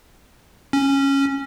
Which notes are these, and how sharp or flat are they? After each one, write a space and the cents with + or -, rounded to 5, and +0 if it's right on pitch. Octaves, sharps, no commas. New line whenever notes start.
C#4 -10